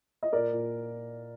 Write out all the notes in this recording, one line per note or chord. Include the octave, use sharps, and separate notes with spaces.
D#5
A#2 A#4 D5
A#2